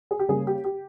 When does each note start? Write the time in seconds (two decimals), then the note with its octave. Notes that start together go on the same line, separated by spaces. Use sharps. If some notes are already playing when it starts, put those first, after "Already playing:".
0.11 G#4
0.19 G4
0.28 C#3 G3 A#3 G#4
0.47 G4
0.64 G4